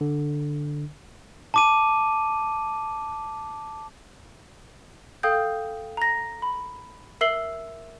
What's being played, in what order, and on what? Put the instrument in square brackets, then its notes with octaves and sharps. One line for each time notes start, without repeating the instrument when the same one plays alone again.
[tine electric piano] D3
[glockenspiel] A5 D6 D#7
[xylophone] A4 F5 G5 D#6 G6
A#5 A#6
B5
A#4 E5 E6 C7 F#7 G7